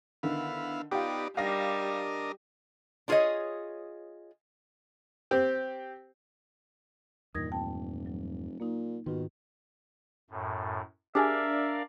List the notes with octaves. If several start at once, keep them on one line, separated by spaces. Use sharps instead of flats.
D3 D#3 B3 E4 F5
B3 D#4 F4 G4 D5
G3 D4 A#4 D#5 F5 A#6
D4 F4 G#4 A#4 C#5 D#5
C4 G4
E2 G2 A#2 D#3 D#6 G#6 A#6
F1 G5 A5
F#3
A#2 A#3 D#4
G#2 B2 D#3 F4
F#2 A2
D4 G4 G#4 A#4 D5 E5 F5 G#5